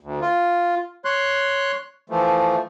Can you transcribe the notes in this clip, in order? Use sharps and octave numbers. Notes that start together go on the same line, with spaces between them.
D2
F4
C#5 C6 F#6
E3 F3 A3